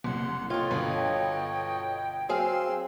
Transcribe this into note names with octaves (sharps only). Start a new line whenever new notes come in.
F#1 C2 F#5 C6
F4 A4 C#5 D#5 G5
G1 B2 B4
F#3 C4 G#4 F5 C6 E6